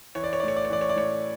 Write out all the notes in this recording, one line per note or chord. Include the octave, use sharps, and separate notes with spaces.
E3 C#5
D5
C#5
D5
A2 C#5
D5
C#5
E3 D5
C#5
D5
A2 C#5